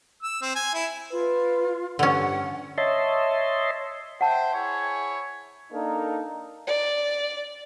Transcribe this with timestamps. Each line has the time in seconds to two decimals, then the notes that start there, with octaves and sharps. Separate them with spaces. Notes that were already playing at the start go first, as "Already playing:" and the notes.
0.23 E6
0.42 C4
0.56 G#5
0.74 E4
1.12 F4 B4
1.99 G2 D3 C#4 F#5
2.78 C#5 D#5 E5 A5 C6
4.21 C5 E5 F#5 G5 A5
4.55 E4 G#4 C#5
5.72 A#3 D4 D#4 A4 A#4
6.67 D5